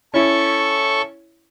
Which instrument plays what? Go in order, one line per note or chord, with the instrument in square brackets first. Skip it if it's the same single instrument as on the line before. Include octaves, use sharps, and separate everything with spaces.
[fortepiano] C#4 E4 [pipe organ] A4 C#6